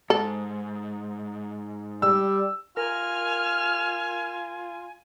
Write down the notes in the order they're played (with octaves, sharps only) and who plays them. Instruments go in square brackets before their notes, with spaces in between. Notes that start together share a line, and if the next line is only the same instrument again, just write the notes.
[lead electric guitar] G#2 [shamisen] A4
[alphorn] G3 [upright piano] E6
[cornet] F4 [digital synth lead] A#4 [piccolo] G#5 [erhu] F6